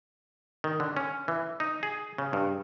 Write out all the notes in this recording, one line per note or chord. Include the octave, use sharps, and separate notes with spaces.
D#3
D3
C#4
E3
D#4
G#4
C#3
G2